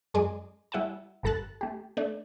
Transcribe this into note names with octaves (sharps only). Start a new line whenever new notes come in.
F#2 G#3 G#4 D5 D#5 D6
G3 E4 F#5 G#5 A5
G1 G2 A4 A5 F#6 A6
A3 G4
A3 D4 D5